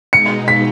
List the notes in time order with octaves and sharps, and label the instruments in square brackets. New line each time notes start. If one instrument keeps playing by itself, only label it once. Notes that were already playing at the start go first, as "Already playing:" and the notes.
[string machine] B2 G#3 D#4 [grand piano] C#7
[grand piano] B6